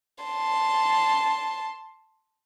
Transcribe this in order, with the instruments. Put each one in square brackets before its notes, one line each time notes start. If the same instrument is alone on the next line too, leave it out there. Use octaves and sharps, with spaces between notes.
[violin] A5 C6